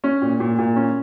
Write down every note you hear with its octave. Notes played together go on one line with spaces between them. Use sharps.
C#4
A#2
A#2
A#2
C#4